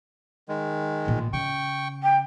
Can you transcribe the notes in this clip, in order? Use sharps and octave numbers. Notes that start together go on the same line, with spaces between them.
D#3 G#3
A1 A#2
C#3 G5 C#6
G5